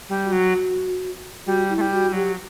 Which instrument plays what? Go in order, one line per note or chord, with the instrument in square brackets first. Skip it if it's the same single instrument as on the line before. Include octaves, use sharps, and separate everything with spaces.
[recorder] G3
[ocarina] F#4
[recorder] F#3
[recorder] G3 [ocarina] F#4
[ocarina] E4
[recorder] A3
G3
[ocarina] F#4
[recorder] G3
[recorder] F#3 [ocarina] G4